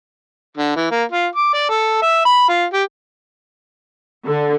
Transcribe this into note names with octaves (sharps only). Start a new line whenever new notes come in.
D3
E3
A#3
F4
D6
D5
A4
E5
B5
F4
G4
D3